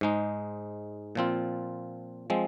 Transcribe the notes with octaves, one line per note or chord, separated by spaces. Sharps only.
G#2 G#3 D#4
A#2 F3 C4 F4
F3 G#3 C4